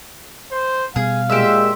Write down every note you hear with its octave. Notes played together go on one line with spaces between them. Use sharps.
C5
B2 G3 G#4 F5
A#2 G#3 G4 C5 E5